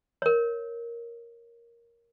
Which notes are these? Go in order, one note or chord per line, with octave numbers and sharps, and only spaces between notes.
A#4 C#5